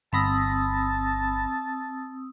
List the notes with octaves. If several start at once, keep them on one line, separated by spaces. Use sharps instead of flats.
G1 C4 A5 B5 D#6 E6 A#6